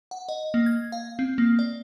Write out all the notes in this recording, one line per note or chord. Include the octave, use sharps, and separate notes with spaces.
F#5
D#5
A#3
G#6
F5
C4
A#3
D5